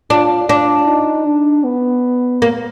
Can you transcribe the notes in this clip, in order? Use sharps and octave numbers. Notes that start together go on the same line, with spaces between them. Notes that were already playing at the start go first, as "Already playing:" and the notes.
D4 F4
D4 F4
D#4
D4
B3
A#3